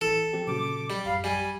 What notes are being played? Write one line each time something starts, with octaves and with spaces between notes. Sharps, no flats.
A1 E3 A4
F3 C4 G4
A#2 C#3 F#3 D6
G3
A1 F#2 F5 B5
G3 G#5